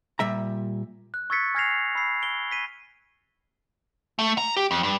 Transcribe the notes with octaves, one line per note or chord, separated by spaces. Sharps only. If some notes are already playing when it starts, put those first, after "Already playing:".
A#2 G3 E5 A#5
F#6
C#6 E6 G#6 A6 B6 C#7
G#5 F6 G#6 A#6 C7 F7
B5 E6 C7
D7 G7
B6 D#7
A3
A#5
G4
F2
G2